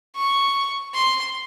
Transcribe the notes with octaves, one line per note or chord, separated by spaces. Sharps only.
C#6
C6